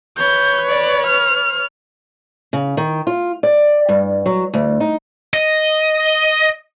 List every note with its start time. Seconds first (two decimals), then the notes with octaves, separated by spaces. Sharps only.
0.18 B4 C#5 G6
0.69 D5
1.07 F6
2.53 C#3
2.77 D#3
3.07 F4
3.43 D5
3.89 G2
4.26 F#3
4.54 D2
4.80 D#4
5.33 D#5